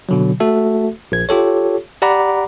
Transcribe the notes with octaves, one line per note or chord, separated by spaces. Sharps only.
B2 D3 F#3
A3 F#4 A4 E5
A#1 G#6
F4 G4 A4 C#5
G4 D5 F#5 A#5 B5 D6